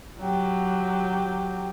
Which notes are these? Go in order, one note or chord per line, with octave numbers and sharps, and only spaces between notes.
F#3 G4